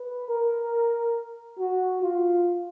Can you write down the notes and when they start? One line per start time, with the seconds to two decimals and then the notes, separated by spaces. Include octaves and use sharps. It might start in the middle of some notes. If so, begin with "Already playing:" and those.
Already playing: B4
0.29 A#4
1.59 F#4
2.02 F4